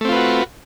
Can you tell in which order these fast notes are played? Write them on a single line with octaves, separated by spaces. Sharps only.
A3 C4 F4 B4 F#4